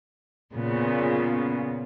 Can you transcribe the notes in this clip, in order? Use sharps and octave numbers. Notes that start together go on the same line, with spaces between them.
A#2 C#3 B3